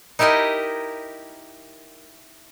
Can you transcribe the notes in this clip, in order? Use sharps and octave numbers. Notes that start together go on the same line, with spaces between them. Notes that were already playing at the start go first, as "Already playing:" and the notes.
D#4 E4 G4 A#4 D#5